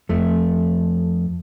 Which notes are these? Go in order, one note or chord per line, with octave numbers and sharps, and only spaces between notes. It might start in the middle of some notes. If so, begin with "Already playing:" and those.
F2 A3